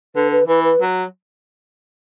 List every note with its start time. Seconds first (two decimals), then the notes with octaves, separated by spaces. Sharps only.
0.15 D3 B4
0.32 B4
0.48 E3 B4
0.64 B4
0.81 F#3